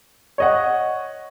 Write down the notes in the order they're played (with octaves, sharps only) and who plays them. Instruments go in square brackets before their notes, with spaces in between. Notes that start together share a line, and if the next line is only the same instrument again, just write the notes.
[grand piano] C#5 D#5 F#5